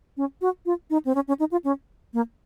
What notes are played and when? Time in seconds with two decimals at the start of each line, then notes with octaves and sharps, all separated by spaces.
0.17 C#4
0.41 F#4
0.66 F4
0.90 D#4
1.05 C4
1.15 C#4
1.28 C#4
1.39 D#4
1.52 F4
1.64 C#4
2.14 A#3